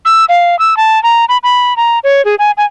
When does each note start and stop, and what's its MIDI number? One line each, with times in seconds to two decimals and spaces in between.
0.05 0.25 88
0.29 0.58 77
0.59 0.77 88
0.77 1.01 81
1.03 1.25 82
1.29 1.38 83
1.43 1.76 83
1.76 1.99 82
2.04 2.24 73
2.25 2.35 68
2.39 2.51 80
2.57 2.65 80